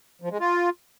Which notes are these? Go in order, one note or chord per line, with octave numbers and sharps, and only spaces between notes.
F3
G#3
F4